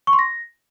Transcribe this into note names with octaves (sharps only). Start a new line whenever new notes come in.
C#6
C6
A#6